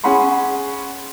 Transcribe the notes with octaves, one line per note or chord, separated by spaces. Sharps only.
C#4 G#4 F#5 B5 C6